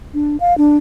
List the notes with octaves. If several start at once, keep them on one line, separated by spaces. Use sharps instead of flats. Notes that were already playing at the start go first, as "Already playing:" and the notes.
D4
F5
D4